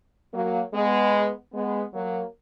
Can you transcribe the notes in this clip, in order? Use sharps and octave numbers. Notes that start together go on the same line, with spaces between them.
F#3 A#3
G#3 B3
G#3 B3
F#3 A#3